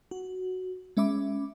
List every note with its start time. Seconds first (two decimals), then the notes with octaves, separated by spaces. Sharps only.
0.11 F#4
0.97 G#3 C#4 E5 B5 D6